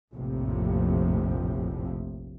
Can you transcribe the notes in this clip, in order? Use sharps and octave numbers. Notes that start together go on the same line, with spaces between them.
F1 A#1 F2 A2 C3 F3